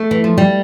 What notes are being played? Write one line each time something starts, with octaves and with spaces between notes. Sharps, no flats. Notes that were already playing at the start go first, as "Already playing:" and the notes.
Already playing: A3
E3
F3
G3